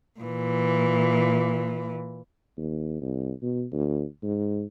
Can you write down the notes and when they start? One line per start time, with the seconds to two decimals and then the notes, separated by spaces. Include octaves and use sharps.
0.20 A#2 E3
2.57 D#2
3.01 C2
3.42 B2
3.72 D2
4.23 G#2